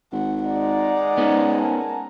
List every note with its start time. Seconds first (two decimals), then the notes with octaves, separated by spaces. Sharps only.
0.13 G#1 F#5
0.46 G#3 D#4 D5 F#5 A#5
1.18 G#2 B3 C#4
1.60 A#4 G#5 A5